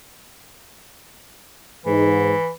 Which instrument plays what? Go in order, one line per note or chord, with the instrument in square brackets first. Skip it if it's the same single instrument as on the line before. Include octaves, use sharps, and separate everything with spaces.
[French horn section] G#2 [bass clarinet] E3